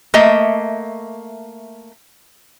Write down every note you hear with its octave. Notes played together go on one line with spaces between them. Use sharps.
A3 A#3 D#5 E5